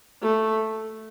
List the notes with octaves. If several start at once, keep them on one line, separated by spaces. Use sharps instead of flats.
A3